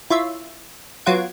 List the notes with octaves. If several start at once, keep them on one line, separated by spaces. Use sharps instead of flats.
E4 F4 C#5 E5
F#3 B3 F4 F#5 G#6 D7